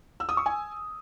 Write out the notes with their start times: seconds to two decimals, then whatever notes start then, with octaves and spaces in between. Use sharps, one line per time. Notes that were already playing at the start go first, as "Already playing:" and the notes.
0.20 E6
0.29 D#6
0.37 C#6
0.46 G#5